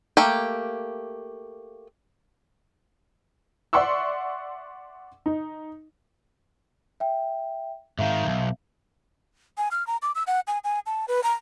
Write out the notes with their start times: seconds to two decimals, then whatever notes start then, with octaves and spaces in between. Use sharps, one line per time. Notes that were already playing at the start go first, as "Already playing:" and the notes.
0.17 A3 A#3 G4
3.73 D5 E5 F#5 C6 C#6 E6
5.26 D#4
7.00 E5 G5
7.99 G#2 D#3 E5 F5
8.25 B1
9.58 G#5
9.71 F6
9.87 A#5
10.02 D6
10.15 E6
10.27 F#5
10.47 G#5
10.64 G#5
10.86 A5
11.08 B4
11.23 A#5